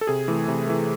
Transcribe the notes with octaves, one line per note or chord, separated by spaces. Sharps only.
A4
C3 G#4
E3 A3
C3
E3 A3